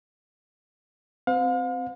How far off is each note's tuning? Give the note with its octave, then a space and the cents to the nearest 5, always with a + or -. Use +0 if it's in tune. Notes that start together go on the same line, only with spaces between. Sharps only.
C4 -10 C5 -40 F5 +40